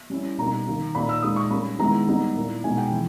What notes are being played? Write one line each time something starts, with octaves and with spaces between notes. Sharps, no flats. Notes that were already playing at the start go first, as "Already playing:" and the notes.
G3 C#4 E4
B2 G3 A#3 D#4 A#5
D#3 A#3 D#4
A#2 A#3 D#4 B5
E6
A#2 G#3 D#4 D#6
C#6
G3 A#3 C#4 B5
D#3 G#3 B3 E4 A#5
G3 B3 D#4
A#2 A#3 E4
B2 G#3 D#4 G#5
G5
E3